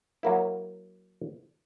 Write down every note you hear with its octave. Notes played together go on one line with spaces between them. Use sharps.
F#3 A#3 E4